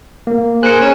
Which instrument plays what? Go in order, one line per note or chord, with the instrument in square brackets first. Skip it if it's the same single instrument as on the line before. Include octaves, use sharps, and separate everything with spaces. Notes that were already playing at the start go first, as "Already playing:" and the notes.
[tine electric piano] A#3
[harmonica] G#4 A#4 C5 [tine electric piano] F#6 C#7
[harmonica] G#3 C#4